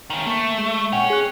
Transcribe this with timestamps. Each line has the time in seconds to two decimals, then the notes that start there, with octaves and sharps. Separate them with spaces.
0.10 D#3 C#4
0.27 A3 A#3
0.58 G#3
0.93 A#2 C#4 F#5 G5
1.10 G#4 F#6